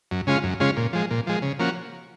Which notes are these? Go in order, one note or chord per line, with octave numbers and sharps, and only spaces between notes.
F#2
C#3 G#3 C#4 F4
F#2
C#3 G#3 C#4 F4
A#2
F3 G#3
A#2
F3 G#3
C#3
F3 A#3 C#4 F#4